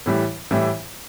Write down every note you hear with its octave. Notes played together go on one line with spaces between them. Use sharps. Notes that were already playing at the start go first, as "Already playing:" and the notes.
A2 E3 G3
A2 E3 G3